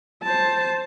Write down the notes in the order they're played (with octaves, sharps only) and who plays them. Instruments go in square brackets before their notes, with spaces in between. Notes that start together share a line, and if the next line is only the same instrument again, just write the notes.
[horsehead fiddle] C5 A5